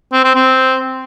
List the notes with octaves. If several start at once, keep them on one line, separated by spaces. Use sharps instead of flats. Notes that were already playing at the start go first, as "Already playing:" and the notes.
C4
C4
C4